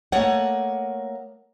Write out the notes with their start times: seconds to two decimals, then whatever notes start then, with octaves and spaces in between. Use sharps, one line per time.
0.12 A3 A#3 C#5 D#5 F#5